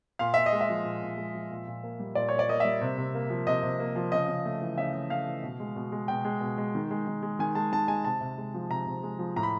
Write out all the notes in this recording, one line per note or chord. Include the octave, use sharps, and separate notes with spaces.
A#2 F5
A#2 E5
D#5
G#3
E5
F3
A#2
A#2
G#3
F3
A#2
A#2
A#3
G3
A#2 D5
A#2 C#5
D5
A#3 D#5
G3 E5
C3
C3
A#3
F3
C3 D#5
C3
A#3
F3
C#3 D#5
C#3
A3
E3
C#3 E5
C#3
A3 F5
E3
B2
G#3
B2
G#3
B2 G5
G#3
B2
G#3
D#3
G#3
D#3
G#3
D#3 G#5
G#3 A5
D#3 A5
G#3 G#5
C3 A5
C3
G#3
F3
C3 A#5
C3
G#3
F3
A2 A#5
B5